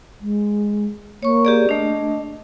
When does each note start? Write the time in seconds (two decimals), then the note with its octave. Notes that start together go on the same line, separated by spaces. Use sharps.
0.21 G#3
1.23 A#3 C#5 C#6
1.45 G4 G#4 D5
1.69 A3 D4 D#5